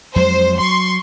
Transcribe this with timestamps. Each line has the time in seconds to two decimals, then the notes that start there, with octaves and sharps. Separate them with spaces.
0.16 F2 F#3 G#3 C5
0.60 F#3 C6 C#6